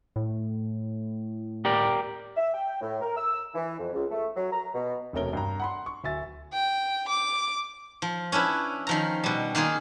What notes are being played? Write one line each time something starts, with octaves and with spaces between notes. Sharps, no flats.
A2
G4 A#4 D5
E5
G5
A2
A#4
E6
E3
F2
C#2
A3
F#3
A#5
B2
E1 C3 A3 C#4 A#4 G7
G2 G5 A#5
F#5 B5 C6
C#6
D1 E5 G#5 A6
G5
D6
F3
C#4 D4 E4 B4
D#3 F3 A#5
B2 G3
D#3 A#3 F4 G#4